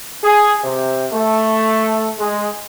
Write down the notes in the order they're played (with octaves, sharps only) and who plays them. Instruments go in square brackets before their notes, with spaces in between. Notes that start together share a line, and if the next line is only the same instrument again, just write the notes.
[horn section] G#4
C3
A3
G#3